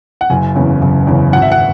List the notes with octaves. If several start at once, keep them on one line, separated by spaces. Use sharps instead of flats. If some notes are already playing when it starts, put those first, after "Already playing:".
F#5
F#1 G#5
E2 C#3
F#1
E2 C#3
G#1 F#5
E5
F#5